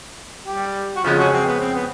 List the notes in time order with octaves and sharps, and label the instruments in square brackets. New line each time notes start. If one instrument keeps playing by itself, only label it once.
[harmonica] G3 G4
F#4
[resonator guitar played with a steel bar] F2 C#3 G#3 C#4 [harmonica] F3 F4
[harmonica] F#3 F#4
C4
B3
C4
B3